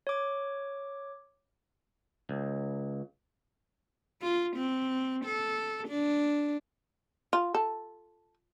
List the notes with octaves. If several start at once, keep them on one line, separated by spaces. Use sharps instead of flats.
C#5 D6
C#2
F4
C4
A4
D4
F4
A4